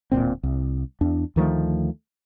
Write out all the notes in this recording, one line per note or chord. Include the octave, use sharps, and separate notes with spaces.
D1 G1 A#2 C4
C2
E2 D4
D2 D#3 F3 A3